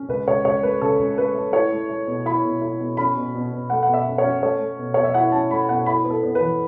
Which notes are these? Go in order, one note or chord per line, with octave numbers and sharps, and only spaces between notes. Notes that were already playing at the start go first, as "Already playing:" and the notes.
Already playing: C#4
C#2 B4
C#2 C#5
C#2 C#5
A3 B4
C#3 A4
C#2
A3 B4
A3
E4 C#5
A3
A3
B2
E4 B5
B2
E4
B2
C#4 B5
B2
B2
B2
A3 F#5
F#5
B2 E5
C#4
C#5
C#4
A3 C#5
A3
B2
B2 C#5
E5
E4 F#5
C#4 A5
A3 B5
B2 F#5
E4 B5
B3
A4
B3
B4
E3